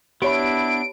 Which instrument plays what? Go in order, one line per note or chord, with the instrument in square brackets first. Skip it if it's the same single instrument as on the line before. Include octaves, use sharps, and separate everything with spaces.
[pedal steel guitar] B3 D4 [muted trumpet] E4 [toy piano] G4 C#5 B5 [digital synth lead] D7